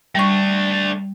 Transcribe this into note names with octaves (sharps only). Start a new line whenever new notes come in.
G3 A3 D4 C#6